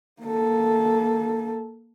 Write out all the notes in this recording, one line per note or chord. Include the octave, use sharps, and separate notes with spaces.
A#3 A4